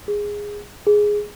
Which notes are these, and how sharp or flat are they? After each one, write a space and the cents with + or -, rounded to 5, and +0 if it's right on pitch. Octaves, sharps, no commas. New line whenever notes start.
G#4 -10
G#4 +0